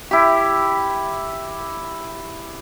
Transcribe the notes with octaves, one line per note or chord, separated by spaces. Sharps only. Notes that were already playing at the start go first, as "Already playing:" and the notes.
E4 G4